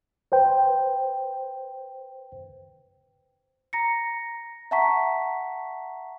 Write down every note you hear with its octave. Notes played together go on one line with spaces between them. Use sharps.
B4 C5 G5
A#5 A#6 C#7
E5 F#5 A5 A#5 C#6 B6